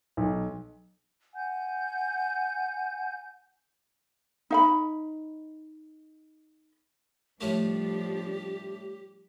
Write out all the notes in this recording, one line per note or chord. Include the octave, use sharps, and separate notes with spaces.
B1
F#5 G#5 G6
D#4 F5 B5
A2 F3 G3 A3 D4 G4